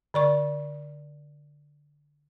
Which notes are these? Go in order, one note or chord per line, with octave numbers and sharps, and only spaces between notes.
D3 D5 C#6